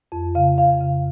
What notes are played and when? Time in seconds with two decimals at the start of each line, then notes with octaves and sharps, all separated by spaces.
0.12 F2
0.35 C#3 F5
0.58 F2 F5
0.81 C#3